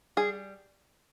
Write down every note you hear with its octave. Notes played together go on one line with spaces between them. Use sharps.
G3 G#4